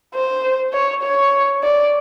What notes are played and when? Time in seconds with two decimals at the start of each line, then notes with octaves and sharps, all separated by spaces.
0.14 C5
0.73 C#5
1.03 C#5
1.63 D5